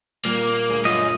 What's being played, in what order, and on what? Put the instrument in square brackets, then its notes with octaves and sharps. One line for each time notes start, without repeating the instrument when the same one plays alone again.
[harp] A#2 G3 [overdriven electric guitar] A#3
[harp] D2 G#4 F6
[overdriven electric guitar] F#2 [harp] F4 [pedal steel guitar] D#5